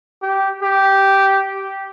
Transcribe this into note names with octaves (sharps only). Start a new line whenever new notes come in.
G4
G4